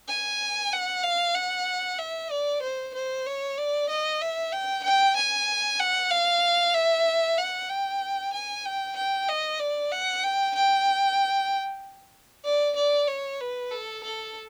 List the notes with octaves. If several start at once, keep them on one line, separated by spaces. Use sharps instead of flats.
G#5
F#5
F5
F#5
E5
D5
C5
C5
C#5
D5
D#5
E5
G5
G5
G#5
F#5
F5
E5
F#5
G5
G#5
G5
G5
D#5
D5
F#5
G5
G5
D5
D5
C#5
B4
A4
A4